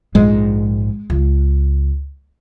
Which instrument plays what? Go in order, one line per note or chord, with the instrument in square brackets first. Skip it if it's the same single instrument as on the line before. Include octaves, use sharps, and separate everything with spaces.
[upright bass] A#1 G#2 [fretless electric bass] G#3
[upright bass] C#2